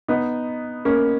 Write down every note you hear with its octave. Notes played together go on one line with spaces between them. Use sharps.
B3 D#4
A#3 C#4